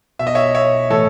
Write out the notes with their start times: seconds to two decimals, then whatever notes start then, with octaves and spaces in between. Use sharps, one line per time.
0.19 B2 E5
0.27 D#5
0.35 C#5 E5
0.55 C#5 E5
0.90 A2 E3 A4 C#5